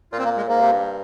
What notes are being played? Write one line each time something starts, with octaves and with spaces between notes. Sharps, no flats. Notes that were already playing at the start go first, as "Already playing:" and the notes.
A#2 F4
C4
A#3
G#3
G#2 A#3
C3
G2